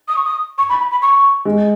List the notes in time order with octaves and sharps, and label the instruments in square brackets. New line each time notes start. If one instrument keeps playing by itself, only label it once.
[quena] D#6
C#6
D#6
C#6
B5
B5
B5
C#6
[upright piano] G#3